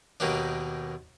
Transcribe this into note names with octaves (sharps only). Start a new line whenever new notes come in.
D#2 B2 D#3 A#3 D4